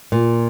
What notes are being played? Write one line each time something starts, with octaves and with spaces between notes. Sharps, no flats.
A#2